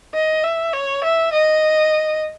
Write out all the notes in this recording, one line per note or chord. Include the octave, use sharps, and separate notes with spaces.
D#5
E5
C#5
E5
D#5